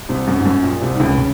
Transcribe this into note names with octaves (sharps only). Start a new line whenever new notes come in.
C2 C3
F#2
G#2
F#2
A#1 A#2
C2 C3
D#3
C#2 C#3
C#3